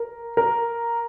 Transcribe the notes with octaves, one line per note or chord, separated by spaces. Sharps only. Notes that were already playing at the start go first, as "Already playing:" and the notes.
Already playing: A#4
A#4